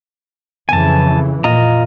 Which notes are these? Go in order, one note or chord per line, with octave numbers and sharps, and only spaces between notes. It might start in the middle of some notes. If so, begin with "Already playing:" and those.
F2 C#3 E3 G#5 A5
A#2 F4 D#5 A#5